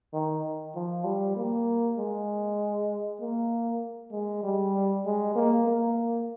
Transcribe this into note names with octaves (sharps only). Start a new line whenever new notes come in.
D#3
F3
G3
A#3
G#3
A#3
G#3
G3
G#3
A#3
A#3